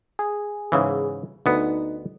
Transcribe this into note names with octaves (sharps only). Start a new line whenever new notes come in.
G#4
G#2 C#3 E3
D2 B3 D#4